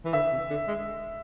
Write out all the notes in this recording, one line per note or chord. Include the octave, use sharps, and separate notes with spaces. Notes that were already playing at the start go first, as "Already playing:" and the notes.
E3
D3 E5
C3
D3
G#3